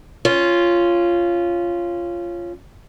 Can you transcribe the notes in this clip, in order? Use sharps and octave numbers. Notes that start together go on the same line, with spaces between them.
C#4 F4